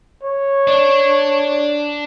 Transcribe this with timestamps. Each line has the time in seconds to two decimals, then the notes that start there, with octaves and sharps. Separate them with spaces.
0.23 C#5
0.67 D4